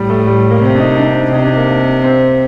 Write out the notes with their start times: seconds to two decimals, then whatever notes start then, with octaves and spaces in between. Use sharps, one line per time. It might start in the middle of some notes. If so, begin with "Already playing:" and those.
Already playing: A2 G3
0.10 A3
0.27 G3
0.51 A#3
0.62 C3 C4
0.75 D4
0.80 D#4
0.97 D4
1.32 C3 D#4
1.45 D4
1.57 A#3
1.69 A#3
2.04 C4